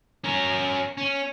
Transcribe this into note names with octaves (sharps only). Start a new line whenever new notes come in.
C#4 A#4
C#4